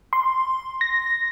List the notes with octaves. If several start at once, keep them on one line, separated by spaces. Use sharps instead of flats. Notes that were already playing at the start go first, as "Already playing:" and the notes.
C6
A#6